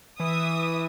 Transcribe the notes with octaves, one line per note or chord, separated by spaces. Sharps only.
E3 E5 D#6